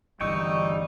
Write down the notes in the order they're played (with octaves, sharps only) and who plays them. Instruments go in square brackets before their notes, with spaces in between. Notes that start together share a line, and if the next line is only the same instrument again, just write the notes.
[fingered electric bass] G1 D2 E3 [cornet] G3 [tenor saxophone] D#4 [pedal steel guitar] G5 C#6 E6